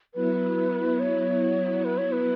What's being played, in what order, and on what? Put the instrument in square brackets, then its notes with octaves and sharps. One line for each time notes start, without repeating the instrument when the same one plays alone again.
[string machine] F#3 B3 E4 [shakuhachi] B4
[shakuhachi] C#5
B4
C#5
B4